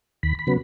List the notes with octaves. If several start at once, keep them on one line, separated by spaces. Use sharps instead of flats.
D#2 B5
B5
C#3 F#3 B3